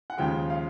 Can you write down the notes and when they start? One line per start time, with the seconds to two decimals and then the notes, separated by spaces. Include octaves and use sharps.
0.10 F#5
0.18 D#2 C#3 F3 G#3 G5
0.50 F5